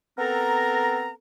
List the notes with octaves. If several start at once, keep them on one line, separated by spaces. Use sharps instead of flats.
B3 C4 A4 A#4 A#5